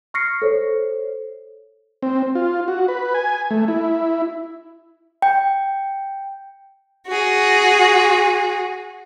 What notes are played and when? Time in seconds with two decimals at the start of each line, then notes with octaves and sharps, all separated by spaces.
0.14 C#6 F6 A#6 C7 C#7
0.42 A4 C5 C#5
2.03 C4
2.35 F4
2.68 F#4
2.88 B4
3.14 G#5
3.51 A3
3.68 E4
5.22 G5
7.07 F#4 G#4